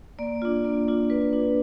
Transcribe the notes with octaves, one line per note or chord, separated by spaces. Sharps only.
A#3 D5
D4 F4
A#3
D4 F4
A#3 B4
D4 F4